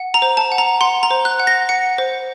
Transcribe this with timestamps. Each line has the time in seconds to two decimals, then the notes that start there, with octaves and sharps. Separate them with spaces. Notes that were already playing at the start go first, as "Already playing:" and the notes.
Already playing: F#5
0.14 A#5
0.22 C5
0.37 A5
0.52 F#5
0.58 A#5
0.81 F#5 C6
1.03 A#5
1.11 C5
1.25 F#6
1.40 F#5
1.47 A#6
1.69 F#5 C#7
1.98 C5